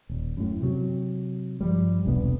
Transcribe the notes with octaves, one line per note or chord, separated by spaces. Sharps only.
D#1
F#2 A2
C3 F#3
G2 F3 G3
E1 C2 D3 B3